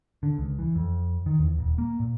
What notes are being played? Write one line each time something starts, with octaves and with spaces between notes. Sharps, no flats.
D3
C#2
E3
F2
D#3
E2
D#1
A#3
A#2